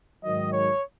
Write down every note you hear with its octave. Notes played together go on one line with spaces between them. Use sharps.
G#2 D#3 F#3 D#5
C#5